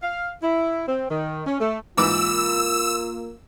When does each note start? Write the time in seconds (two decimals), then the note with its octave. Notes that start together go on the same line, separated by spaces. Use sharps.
0.03 F5
0.43 E4
0.88 C4
1.11 D#3
1.47 C#4
1.61 A3
1.97 G#2 E3 A#3 F4 D6 E6